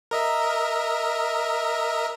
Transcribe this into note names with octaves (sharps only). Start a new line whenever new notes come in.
A#4 D#5 E5